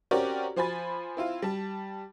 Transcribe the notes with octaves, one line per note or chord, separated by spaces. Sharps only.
C4 C#4 F#4 G4 A#4 D5
F3 C5 G#5 B5 A6
C4 E4 F4
G3 A5